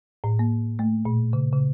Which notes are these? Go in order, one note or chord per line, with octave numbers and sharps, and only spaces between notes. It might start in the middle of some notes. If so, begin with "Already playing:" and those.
A2
A#3
A3
A#2
C#3
C#3